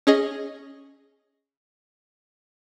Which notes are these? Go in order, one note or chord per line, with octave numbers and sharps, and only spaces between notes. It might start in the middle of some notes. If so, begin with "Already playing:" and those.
C#4 G#4 D#5